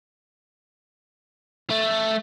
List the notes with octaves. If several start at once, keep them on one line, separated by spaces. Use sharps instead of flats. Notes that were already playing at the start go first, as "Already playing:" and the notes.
A3